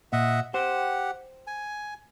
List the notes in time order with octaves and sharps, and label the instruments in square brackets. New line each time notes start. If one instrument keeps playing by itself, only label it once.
[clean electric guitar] A#2 [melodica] D#5 E5 F#5
[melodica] G4 F#5 [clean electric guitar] C5 G5
[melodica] G#5